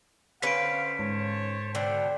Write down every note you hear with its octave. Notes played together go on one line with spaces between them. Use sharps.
D3 C#4 B4 C5 F5 B6 D7
G#2 C5 C#5 A5
B2 D3 C5 G5